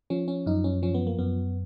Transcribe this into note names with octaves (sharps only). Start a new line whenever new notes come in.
F3 C#4
C#4
F#2 D#4
C#4
F3 C#4
B3
A#3
F#2 B3